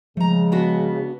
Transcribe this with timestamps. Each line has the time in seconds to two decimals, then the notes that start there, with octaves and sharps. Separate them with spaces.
0.17 C#3 F3 G#3 A3 A#5
0.52 B3 D4 F#4